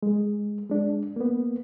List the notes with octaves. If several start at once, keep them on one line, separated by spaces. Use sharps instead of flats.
G#3
G#3 D4
A#3 B3